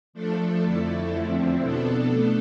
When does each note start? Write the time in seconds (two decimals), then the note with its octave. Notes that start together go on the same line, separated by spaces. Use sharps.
0.13 F3 A3 D4 A4
0.63 F2 D3 A3 E4 A4
1.12 E2 D3 F3 C4 E4
1.60 B2 B3 D4 A4
2.10 A3 D4 A4